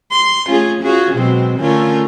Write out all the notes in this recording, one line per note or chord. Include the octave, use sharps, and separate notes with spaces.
C6
A3 C#4 F4 G#4
C#4 F4 F#4 G#4
B2 F#3 G#3 C4
D3 A3 C#4 F4 A#4